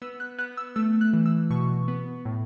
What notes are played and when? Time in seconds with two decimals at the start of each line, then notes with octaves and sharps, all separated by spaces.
0.02 B3 E6
0.20 F#6
0.38 B3 F#6
0.57 E6
0.76 A3 E6
1.01 F#6
1.13 E3
1.26 E6
1.50 B2 C#6
1.88 B3
2.25 A2